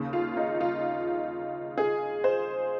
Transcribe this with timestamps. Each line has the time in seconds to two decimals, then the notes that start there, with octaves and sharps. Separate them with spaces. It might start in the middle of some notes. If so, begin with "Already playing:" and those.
Already playing: D#2 C#3
0.13 F4
0.37 D#4
0.61 F4
1.78 G#4
2.24 C5